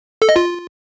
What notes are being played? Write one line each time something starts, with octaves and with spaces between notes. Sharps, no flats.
A4
D#5
F4